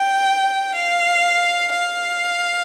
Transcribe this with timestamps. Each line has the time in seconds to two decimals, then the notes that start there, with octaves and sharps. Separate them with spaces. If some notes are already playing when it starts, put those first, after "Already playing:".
Already playing: G5
0.75 F5
1.73 F5